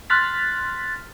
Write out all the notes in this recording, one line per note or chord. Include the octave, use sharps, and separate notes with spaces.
C6 F6 F#6 A6 B6